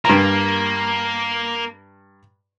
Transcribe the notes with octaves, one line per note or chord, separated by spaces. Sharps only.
G2 A#3 A#5